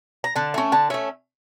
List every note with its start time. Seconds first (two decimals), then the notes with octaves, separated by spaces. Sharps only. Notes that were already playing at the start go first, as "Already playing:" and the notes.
0.24 A#5
0.36 D3 A5
0.54 A3 C#4
0.72 D3 A5
0.90 A3 C#4 E5